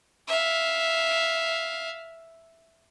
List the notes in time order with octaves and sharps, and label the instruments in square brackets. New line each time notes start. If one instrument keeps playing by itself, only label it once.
[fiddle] E5 F5